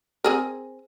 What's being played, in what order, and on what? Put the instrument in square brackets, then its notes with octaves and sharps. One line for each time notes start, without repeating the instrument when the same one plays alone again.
[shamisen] C4 G#4 A#4